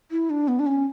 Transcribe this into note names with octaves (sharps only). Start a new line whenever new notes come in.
E4
D4
B3
D4
C#4